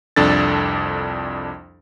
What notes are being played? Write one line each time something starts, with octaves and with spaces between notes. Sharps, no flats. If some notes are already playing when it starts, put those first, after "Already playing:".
C2 F2 D4 A4 A6